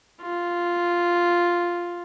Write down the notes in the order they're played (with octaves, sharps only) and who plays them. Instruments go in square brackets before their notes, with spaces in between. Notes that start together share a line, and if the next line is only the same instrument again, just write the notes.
[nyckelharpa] F4